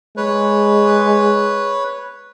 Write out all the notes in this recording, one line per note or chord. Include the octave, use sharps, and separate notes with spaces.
G#3 B4 C#5